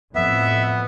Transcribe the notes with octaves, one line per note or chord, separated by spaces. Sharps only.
F2 A2 B3 E5